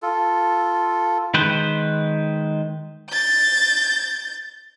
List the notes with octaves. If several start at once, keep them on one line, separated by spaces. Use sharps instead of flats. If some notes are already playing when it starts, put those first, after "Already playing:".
F4 A4
D#3 G#3 B4 C5
G6 A6